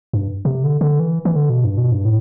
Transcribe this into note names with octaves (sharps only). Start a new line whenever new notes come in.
G2
C3
D3
D3
E3
E3
D3
B2
G2
B2
G2
A2